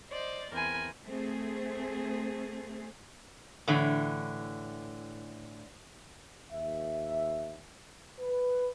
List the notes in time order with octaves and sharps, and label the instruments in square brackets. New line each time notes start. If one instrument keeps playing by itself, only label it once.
[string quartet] C5 D5 D#5
[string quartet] E2 C4 B5 [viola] A#4 G#5
[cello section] A3 C4 G#4
[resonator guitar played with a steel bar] A2 D3 E3
[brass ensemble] D#2 E5
B4